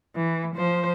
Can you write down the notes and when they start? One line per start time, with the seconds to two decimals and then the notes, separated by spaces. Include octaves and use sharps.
0.16 E3
0.56 F3 C5